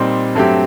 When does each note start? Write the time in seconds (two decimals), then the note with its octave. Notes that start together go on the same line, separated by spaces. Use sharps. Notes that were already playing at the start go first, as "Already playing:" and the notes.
Already playing: A#2 G3 C4 D#4
0.35 G2 F#3 A3 C4 G4